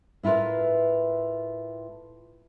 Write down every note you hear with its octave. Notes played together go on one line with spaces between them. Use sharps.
A2 E4 F4 A#4 B4